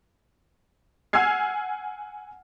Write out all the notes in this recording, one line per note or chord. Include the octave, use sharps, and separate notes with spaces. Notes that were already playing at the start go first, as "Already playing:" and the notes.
F#5 G#5 E6 F6 G#6 C7